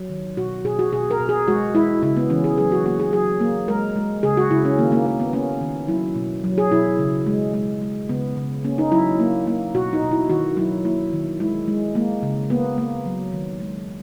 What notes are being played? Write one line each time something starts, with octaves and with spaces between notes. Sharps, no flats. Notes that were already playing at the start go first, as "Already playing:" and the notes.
Already playing: F#3
D#3
B2 F#4
B2 G#4
F#4
B2 G#4
A#4
B2
G#4
G#3 F#4
G#3 E4
C#3 E4
B3
E3 C#4
G#4
F#3 G#4
F#4
A#3 F#4
G#4
F#3 G#4
A#3
G#3 A#4
G#3
C#3 G#4
F#4
C#3 E4
C#4
D#3 A#3
A#3
A#3
B3
A#3 C#4
D#3
F#3 E4
B2
F#3
G#4
B2 E4
C#3
G#3
G#3
G#3
C#3 B3
C#3
A#3 C#4
D#4
F#3 E4
A#3
A#3
B2 F#4
D#4
B2
E4
D#3 F#4
F#3 E4
A#3 E4
D#3
G#3 E4
G#3
G#3 A#3
C#3
A#3 B3
A#3
F#3
D#3
G#3